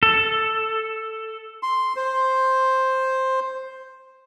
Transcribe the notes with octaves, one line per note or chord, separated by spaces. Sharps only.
A4
C6
C5